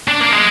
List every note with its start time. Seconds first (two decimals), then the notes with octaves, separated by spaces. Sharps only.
0.08 D4
0.20 A#3
0.32 G#3